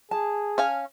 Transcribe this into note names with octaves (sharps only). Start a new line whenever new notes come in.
G#4 A5
C#4 F5 G#5